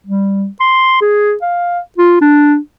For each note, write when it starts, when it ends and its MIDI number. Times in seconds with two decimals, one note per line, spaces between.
0.07 0.47 55
0.60 0.98 84
1.01 1.34 68
1.42 1.79 77
1.98 2.18 65
2.21 2.57 62